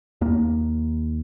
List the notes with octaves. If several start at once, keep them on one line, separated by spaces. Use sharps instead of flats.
D#2 A#3